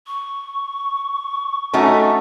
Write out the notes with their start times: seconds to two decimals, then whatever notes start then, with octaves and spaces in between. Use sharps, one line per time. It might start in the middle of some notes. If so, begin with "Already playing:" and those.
0.07 C#6
1.73 A3 C#4 D#4 F#4 A4